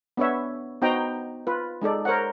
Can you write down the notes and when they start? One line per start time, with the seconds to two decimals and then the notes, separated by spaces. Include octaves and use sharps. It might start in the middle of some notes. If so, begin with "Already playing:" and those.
0.17 B3 D4 B4 C#5 E5
0.82 B3 D#4 F#4 C5 G5 A#5
1.47 F4 B4
1.82 G#3 D#4 A4 D5
2.05 A#4 C5 C#5 F#5